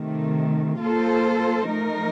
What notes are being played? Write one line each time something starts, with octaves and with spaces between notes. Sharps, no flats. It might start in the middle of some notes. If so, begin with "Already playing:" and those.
Already playing: C3 D#3 A3
A#3 F4 A4 C5
F3 A3 D#4 A#4